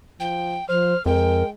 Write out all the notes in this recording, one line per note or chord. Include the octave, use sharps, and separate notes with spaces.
F3 G5
F3 C5 F6
F2 G#3 A#4 G5